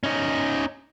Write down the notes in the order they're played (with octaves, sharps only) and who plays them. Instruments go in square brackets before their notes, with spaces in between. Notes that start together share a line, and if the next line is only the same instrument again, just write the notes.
[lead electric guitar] C#4 D#4